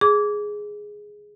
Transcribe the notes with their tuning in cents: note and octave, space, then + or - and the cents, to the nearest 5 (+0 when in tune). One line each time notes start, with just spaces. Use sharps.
G#4 +0 D6 -25